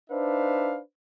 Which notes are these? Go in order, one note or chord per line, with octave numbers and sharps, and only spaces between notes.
D4 D#4 B4 C5 E5 F5